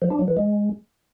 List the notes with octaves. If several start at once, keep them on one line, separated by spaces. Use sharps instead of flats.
F3
D4
F#3
E3
G#3